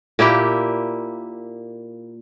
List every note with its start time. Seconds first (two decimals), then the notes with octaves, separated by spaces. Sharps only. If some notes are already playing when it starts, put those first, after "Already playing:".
0.19 A#2 A#3 E4 G4